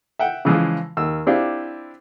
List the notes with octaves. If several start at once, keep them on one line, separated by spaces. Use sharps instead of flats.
E5 F#5 G5
C#3 E3 F3 G#3
D#2 E6
C4 D4 E4 F4 G4